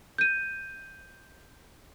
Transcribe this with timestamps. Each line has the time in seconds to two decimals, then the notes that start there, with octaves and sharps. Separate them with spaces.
0.18 G6 D#7